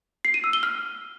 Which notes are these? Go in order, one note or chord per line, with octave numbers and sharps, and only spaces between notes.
C7
D#7
E6
G7
F6